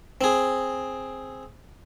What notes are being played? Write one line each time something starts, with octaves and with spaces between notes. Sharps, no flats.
C4 G#4